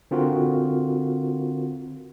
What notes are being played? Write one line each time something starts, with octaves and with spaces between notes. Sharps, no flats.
D3 C4 F4 F#4 A#4